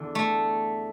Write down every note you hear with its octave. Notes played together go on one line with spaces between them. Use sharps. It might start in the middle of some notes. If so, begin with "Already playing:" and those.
Already playing: E2 D3
A3